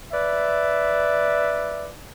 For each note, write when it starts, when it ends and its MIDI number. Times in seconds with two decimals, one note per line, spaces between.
0.13 1.88 71
0.13 1.88 74
0.13 1.88 76